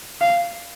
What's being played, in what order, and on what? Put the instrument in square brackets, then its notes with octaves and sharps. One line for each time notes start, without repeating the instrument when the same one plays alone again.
[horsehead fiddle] F5